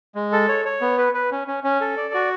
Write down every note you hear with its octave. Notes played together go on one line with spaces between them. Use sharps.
G#3
A4
C#5
C#5
B3
B4
B4
C#4
C#4
C#4
A4
D5
F#4